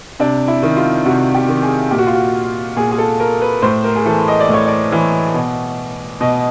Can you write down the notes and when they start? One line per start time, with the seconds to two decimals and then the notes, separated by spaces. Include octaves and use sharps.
0.20 C3 D4
0.48 E4
0.63 D#3
0.77 F4
1.05 C3 F#4
1.34 G4
1.49 D#3
1.63 G#4
1.91 A#2 G4
1.98 F#4
2.07 F4
2.15 F#4
2.76 A#2 G#4
2.91 G#4
2.98 A4
3.20 A#4
3.42 B4
3.62 A2 C5
3.84 A#4
3.96 G#4
4.05 E3 A4
4.28 D#5
4.40 D5
4.49 A2
4.54 C#5
4.68 D5
4.92 E3
5.34 B2
6.21 B2 D#5